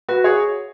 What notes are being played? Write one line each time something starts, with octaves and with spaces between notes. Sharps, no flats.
F#4 B4
G#4 C#5